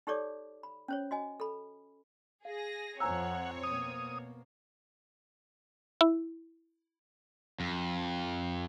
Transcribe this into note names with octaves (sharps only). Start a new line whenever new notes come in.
D#4 G4 A4 C#5 D5 D6
B5
C#4 C5 C#5
F#4 D#5 G#5
A4 B5
G#4 F5 A#6
F2 F3 C4 C#5 F#5 G#5 A#5 E6
B2 A#3 D#6
E4
F2